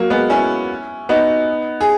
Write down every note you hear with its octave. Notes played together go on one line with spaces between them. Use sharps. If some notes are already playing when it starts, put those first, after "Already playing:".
Already playing: F#3 A#3
G#3 B3
C#4 E4
B3 D#4
G#4